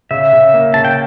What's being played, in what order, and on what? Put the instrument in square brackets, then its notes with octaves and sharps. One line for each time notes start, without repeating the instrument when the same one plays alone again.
[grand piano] C#3 [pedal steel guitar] E5
[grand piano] C#3
A#3
[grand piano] C#3 [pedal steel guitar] A5
[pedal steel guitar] G5